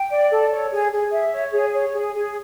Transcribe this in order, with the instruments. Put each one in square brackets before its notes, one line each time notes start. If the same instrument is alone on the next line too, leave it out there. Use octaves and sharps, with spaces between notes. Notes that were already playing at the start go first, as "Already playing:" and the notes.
Already playing: [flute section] G5
D5
A4
C#5
G#4
G#4
E5
C#5
G#4
C#5
G#4
G#4